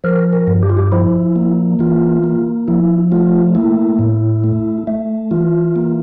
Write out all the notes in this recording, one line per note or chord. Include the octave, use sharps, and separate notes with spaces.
F3 A#4
A#4
G2
G4
F4
G4
F3 E4
A#3
E3 F4
A#3
F3 E4
A3 F4
A#3 E4
A2
A3
A3
E3 F4
A#3